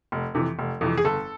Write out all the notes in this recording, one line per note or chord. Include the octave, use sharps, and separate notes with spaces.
F1
F2 C3 E3
F1
F2 C3 E3
G#4
G1 A4